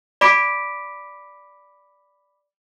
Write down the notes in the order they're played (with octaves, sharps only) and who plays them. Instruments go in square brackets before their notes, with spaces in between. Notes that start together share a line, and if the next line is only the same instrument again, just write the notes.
[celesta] D5 B5 D6 B6 D7